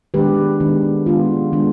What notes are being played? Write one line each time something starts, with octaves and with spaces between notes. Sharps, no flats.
D#3 G#3 B3 D4 G4 B4
D#3 G#3 B3 D4
D#3 G#3 B3 D4 F4
D#3 G#3 B3 D4